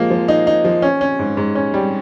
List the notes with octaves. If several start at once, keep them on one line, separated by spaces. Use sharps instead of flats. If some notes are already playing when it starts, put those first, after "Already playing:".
Already playing: F3 G#3 A#3
F3
D#4
D#4
F3
C#4
C#4
G#2
G#2
C#4
G3